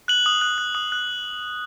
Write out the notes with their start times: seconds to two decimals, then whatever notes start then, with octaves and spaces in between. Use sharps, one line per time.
0.08 F#6 F#7
0.26 D#6
0.42 F#6
0.58 F#6
0.75 D#6
0.92 F#6